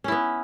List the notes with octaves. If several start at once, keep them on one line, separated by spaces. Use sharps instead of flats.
B3 C#4 E4